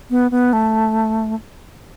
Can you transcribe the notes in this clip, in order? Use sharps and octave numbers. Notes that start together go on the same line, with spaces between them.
B3
B3
A3